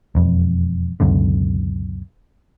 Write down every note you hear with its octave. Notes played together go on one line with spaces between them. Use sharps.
E1 F2
C#2 F#2 B2 D3